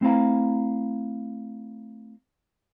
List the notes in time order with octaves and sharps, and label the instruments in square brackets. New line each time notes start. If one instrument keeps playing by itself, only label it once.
[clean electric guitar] A3 C4 E4 F5 A#5